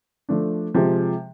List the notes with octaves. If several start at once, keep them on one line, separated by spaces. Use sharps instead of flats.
F3 A3 D4
C3 F3 G#3